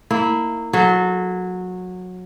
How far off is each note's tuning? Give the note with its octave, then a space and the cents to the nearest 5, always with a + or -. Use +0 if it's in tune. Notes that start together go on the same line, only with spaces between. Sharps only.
A#3 -20 E4 -15
F#3 -20 A4 -35